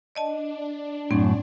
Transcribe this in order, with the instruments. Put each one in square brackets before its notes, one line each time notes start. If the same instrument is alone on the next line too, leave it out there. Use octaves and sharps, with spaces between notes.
[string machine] D4 [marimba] D5 D#5 A5
[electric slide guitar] F#2 A2 [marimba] C4